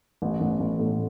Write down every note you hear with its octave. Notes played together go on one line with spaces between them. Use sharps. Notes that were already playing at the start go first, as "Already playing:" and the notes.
A1
A1
A1
A2